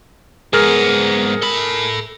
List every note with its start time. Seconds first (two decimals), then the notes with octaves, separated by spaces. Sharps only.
0.53 G#2 B3 G#4 A#4 F6
1.42 A4 B5